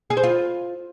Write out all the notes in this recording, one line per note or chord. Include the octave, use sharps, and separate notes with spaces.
G#4
C5
F4